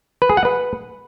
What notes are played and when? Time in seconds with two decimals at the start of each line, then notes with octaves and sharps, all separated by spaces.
0.22 B4
0.29 G#4
0.37 F#5
0.45 B4